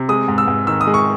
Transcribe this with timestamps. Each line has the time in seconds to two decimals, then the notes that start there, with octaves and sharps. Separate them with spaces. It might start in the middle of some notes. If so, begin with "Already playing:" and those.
Already playing: C3
0.09 G#3 D#6
0.28 G#2
0.38 E6
0.48 G#2
0.67 D#3 E6
0.81 D#6
0.87 G#3
0.94 C#6